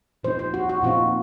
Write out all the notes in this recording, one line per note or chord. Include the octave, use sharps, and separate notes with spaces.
A#2 F3 C4 D#4 C5
C5
F#4
F#4
A#2 F3 C4 D#4 F4